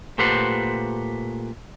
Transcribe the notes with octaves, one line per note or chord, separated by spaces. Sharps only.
A#2 A3 G4 B4 C5 F#5